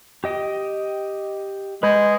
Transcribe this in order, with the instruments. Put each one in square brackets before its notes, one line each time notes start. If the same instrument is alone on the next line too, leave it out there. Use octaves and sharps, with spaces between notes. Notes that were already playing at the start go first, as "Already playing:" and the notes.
[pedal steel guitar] G4 D#5 G5
[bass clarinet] G#3 [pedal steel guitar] B4 B5 G6